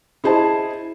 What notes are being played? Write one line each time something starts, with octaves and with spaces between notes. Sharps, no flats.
E4 G#4 C5 D#5 A5